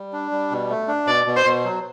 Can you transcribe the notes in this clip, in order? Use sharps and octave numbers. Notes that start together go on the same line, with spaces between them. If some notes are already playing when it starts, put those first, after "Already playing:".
Already playing: G3
D4
G3
B2
A3
D4
B2 D5
B2
C5
B2
F#3